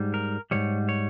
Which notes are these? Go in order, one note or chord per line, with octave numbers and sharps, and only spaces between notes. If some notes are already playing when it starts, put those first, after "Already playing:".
Already playing: G#2 G3
A#4
G#2 E3 G3 C#5
C#5